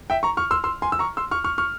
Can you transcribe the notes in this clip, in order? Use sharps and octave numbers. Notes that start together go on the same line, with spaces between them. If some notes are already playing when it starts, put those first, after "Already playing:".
E5 G5
A#5 C#6
C#6 F6
C6 E6
C6 E6
G#5 C6
E6
A#5 C#6
C6 E6
C#6 F6
C#6 F6
C#6 F6